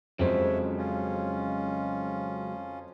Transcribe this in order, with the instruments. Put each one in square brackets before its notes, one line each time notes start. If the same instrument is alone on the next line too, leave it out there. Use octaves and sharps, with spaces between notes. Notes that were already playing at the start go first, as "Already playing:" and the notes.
[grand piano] F2 C5 [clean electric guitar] C#3 F#3 G#3 [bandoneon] C#5 E5
[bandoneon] C#4 F4